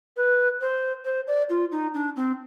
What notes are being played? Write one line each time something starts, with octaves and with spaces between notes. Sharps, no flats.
B4
C5
C5
D5
F4
D#4
D4
C4